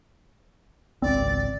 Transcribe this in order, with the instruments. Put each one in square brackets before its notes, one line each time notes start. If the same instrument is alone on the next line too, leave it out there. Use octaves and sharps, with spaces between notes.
[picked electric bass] G#1 C#2 C4 [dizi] D5